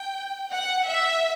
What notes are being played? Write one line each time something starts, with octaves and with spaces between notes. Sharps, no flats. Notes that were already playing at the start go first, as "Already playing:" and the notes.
Already playing: G5
F#5
E5